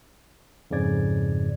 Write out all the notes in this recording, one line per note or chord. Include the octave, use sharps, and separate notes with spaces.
F2 G#2 C#3 D5 G#6